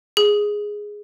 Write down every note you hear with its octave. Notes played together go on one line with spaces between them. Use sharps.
G#4